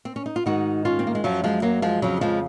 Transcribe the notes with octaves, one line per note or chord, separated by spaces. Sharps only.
C4
C#4
D#4
F4
G#2 D#3 D#4 F#4
C#4 F4
C4
A#3
G#3
F#2 F3 F#3
F3 G#3
F#3 A#3
F3 G#3
F2 C#3 F3 F#3
F3 G#3